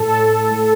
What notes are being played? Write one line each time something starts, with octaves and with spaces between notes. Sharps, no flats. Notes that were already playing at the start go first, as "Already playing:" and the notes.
Already playing: A2 A4
A2